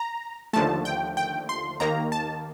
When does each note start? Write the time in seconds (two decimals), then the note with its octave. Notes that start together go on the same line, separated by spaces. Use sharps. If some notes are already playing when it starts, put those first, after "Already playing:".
Already playing: A#5
0.53 D#2 D3 F3 A3 A5
0.85 G5
1.17 G5
1.49 C6
1.80 D#2 D#3 A#3 A#5
2.12 A5